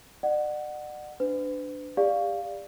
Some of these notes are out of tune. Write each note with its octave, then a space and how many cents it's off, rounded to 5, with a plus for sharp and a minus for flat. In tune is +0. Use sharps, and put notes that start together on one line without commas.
D5 +40 F#5 +0
D4 +0 B4 +40
G4 +35 D5 +0 F5 +0